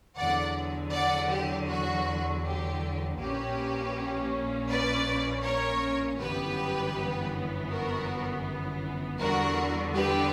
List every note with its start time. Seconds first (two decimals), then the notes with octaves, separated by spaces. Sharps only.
0.17 E2 D3 F#3 D5 F#5
0.93 D5 F#5
1.30 G4
1.68 F#4
2.44 G4
3.18 A#1 A#2 A#3 C#4 G4 B4
4.69 B4 D5
5.43 A#4 C#5
6.19 G1 F#2 E3 B3 G4 B4
7.69 F#4 A#4
9.19 E2 D3 G3 B3 F#4 A#4
9.94 G4 B4